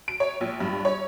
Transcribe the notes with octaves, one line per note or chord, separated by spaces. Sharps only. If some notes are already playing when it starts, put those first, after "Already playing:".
D7
C#5
A#1
G2
C#5